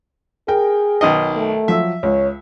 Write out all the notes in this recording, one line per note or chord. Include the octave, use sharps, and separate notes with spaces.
G#4 A#4 G5
B1 D#3 D#5
A3
F3 F#3 E5
C#2 C#5